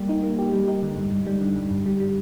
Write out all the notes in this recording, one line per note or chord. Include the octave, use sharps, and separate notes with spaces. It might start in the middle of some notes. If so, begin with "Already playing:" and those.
Already playing: G3 A#3 G4
D#4
A#3
G4
G3
D#4
D3
G2
G2
G3
D3
G2
G2
G3
G3